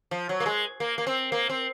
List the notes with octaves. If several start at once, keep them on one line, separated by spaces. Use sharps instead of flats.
F3
F#3
A#3
G#3
A#3
A#3
C4
A#3
C4